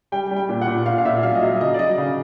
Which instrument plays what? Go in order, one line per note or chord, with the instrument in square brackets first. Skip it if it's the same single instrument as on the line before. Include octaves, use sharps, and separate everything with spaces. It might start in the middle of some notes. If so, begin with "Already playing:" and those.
[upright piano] G3 G5
G3
G5
A#2
F#5
A#2
A#2 F5
F5
A#2 E5
F#3 F5
D#5
F#3 E5
C#3 D#5
D5
F#3 D#5
C#3 F5